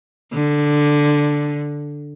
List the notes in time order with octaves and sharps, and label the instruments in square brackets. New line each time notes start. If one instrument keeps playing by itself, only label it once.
[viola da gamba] D3